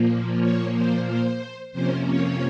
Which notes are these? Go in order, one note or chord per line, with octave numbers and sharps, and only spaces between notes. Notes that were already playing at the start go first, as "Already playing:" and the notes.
Already playing: A#2 F3 A#3
C#5
C5
C5
F2 C3 F3 A#3 C#4 C5
C#5